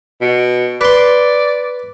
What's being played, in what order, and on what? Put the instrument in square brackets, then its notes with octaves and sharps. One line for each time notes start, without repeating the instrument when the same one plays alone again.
[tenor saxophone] B2
[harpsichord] B4 C6 [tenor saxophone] D5